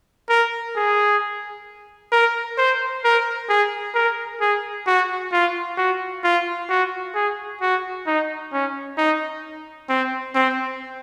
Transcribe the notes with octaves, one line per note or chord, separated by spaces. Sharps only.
A#4
G#4
A#4
C5
A#4
G#4
A#4
G#4
F#4
F4
F#4
F4
F#4
G#4
F#4
D#4
C#4
D#4
C4
C4